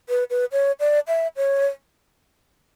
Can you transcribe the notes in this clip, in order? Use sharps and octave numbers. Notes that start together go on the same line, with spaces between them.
B4
B4
C#5
D5
E5
C#5